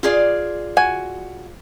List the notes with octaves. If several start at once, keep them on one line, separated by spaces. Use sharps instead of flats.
F4 G#4 D5
F#4 G#5